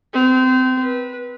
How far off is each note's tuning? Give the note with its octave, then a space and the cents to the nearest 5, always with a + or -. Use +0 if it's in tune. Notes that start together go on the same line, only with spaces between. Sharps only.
C4 -25
B4 -20